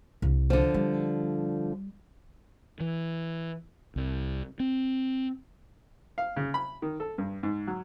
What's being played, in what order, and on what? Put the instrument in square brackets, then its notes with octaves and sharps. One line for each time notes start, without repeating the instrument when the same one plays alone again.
[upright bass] C2
[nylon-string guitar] D3 F3
[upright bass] G3
[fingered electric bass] E3
C2
C4
[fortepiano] F5
C#3
B5
D#3
A4
G2
G#2
F#3